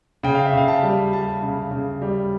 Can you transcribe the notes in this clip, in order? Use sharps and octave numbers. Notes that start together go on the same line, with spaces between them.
C#3 G5
F5
E5
C#3 F5
A5
G3
G3 A5
C#3
C#3
G3